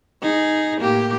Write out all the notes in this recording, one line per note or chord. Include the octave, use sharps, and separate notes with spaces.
D#4 G#4
A2 A#3 G4